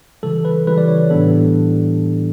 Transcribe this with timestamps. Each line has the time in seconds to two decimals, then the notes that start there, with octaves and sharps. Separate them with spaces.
0.23 C#3 E3 G3 A4
0.45 B4
0.67 C#3 E3 G3 B4
0.78 D5
0.88 C#5
1.10 A2 E3 G3 B3 D4 A4